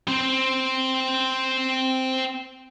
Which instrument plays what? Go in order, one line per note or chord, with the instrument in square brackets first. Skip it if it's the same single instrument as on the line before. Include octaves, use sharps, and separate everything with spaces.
[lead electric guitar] C4 C5